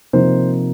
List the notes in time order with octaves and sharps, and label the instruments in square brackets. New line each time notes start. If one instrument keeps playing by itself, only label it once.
[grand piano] C3 F3 A#3 D#4 C5